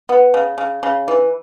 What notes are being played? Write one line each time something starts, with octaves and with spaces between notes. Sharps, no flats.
B3
C#3
C#3
C#3
E3